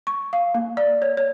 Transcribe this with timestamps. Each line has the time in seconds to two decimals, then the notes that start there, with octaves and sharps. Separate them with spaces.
0.07 C#6
0.33 F5
0.54 A#3
0.77 D5
1.02 C#5
1.17 C#5